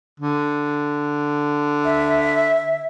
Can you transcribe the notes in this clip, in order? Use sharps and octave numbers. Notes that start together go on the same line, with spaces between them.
D3
E5